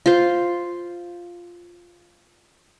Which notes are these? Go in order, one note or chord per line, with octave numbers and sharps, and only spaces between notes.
F4 C5